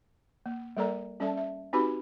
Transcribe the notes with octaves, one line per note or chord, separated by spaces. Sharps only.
A#3
G3 A#3 A4 A#4 D5 A#5
G3 C#4 A4 D5 E5 A5
E5
C4 D#4 F#4 G4 B4 B5